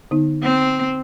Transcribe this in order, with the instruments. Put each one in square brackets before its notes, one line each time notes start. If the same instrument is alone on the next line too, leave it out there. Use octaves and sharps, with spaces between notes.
[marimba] D3 B3 D#4
[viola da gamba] C4